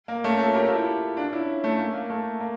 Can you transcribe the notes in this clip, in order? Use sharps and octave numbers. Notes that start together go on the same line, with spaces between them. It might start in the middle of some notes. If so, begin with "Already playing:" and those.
A#3
A3 C#4
F4 A4
G4 A#4
F4 A4
E4 G4
D4 F4
C#4 E4
A3 C#4
A#3
A#3
A3
A#3